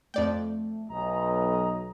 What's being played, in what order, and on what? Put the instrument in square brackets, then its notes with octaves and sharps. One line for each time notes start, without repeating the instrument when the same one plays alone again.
[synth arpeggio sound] F2 D5 G5 [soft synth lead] A3
[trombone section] B1 [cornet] D#5 [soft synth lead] A#5